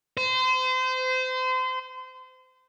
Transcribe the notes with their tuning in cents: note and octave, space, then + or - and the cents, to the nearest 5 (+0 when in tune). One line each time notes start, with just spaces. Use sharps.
C5 -30